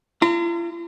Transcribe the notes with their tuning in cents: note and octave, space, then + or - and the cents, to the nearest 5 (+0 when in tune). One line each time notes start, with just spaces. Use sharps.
F4 -45 A#5 -30